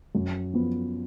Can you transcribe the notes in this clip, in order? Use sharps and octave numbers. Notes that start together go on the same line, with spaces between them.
F#2
F3 B3